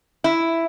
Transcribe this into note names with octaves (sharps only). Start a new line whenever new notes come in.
E4